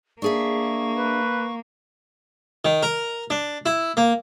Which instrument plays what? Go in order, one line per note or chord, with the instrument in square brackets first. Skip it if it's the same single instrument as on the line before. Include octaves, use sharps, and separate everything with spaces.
[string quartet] A#3 [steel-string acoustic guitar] D4 G#4 E5 [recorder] C#6
[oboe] B4
[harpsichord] D#3
A#4
D4
E4
A#3